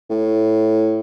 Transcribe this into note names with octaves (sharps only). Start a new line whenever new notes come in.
A2